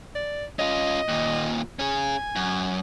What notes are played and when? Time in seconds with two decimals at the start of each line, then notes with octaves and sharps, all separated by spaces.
0.15 D5
0.59 C#4 F4 D#5
1.09 D#2 A#2
1.79 C#4 G#4 G#5
2.36 F#2